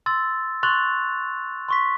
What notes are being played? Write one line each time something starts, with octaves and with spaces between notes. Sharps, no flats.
C6 E6 A6
C6 C#6 F#6 A6 F7
C6 C#6 B6